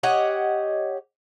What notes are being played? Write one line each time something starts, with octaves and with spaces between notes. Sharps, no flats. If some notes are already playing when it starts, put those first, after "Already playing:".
G4 C#5 D#5 F#5